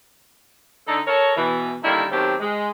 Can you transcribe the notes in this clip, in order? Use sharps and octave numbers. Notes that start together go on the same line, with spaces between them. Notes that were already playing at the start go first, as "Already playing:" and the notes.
D3 D#4 A4
A4 A#4 C#5
B2 E3
D3 D#3 G3 A#3 D#4 E4
B2 D#3 F#3 A3 C4 G4
G#3